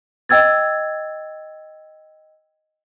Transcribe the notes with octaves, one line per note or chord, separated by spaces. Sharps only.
D#5 G5 E6 G#6 A6